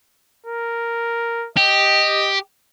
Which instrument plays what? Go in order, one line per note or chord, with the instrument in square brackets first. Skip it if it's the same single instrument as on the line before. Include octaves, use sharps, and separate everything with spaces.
[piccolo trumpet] A#4
[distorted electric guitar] G4 [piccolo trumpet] D#5